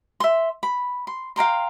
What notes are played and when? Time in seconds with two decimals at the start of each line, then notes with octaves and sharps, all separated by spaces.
0.20 E5 C6
0.63 B5
1.07 C6
1.36 F5 G5 A#5 C6